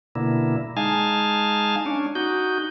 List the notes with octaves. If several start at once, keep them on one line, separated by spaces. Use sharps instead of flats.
B2 D3 A#3 E4
G#3 D#4 F5 G#5 A5
C#4 D4
D#4 F#4 G6